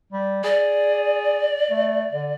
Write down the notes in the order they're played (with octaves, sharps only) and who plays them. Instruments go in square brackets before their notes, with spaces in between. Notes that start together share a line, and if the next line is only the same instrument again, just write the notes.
[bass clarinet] G3
[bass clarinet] G#4 [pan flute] D5
[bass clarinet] A3
D3